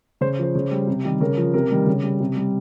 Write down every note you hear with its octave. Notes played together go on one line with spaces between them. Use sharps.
C#3 C5
F3 C5
C#3
G3
C3
D#3 G3
C#3 A#4
F3
C3 A#4
D#3 G3
C#3
G3
C3
G3